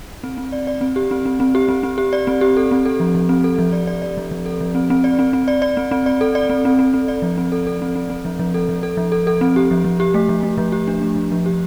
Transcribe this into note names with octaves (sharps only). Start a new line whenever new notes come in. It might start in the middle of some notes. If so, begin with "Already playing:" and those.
C4
C4
D5
D5
C4
G4
C4
C4
C4
G4
C4
C4
G4
D5
C4
G4
A4
C4
A4
F3
F3
C4
A4
F3
D5
D5
D5
F3
F3
A4
F3
C4
C4
D5
C4
C4
D5
D5
C4
C4
D5
A4
D5
C4
C4
C4
C4
D5
F3
C4
A4
A4
C4
C4
C4
F3
F3
A4
F3
A4
F3
A4
A4
C4
G4
F3
F3
G4
A3
F3
A3
F3
G4
D4
A3
F3
F3
G4